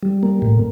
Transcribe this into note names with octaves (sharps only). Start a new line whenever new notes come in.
G3
A#3
A2